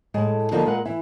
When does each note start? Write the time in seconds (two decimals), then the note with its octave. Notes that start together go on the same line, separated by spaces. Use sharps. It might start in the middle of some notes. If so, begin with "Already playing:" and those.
0.14 A2 G#3 G#4 A5
0.51 D3 F3 A#3 D#4 F4 A4
0.65 A#2 G#3 A#4 B4 F#5
0.85 E3 E4